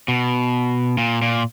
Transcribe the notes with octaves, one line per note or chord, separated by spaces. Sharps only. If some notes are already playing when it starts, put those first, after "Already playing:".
B2
A#2
A#2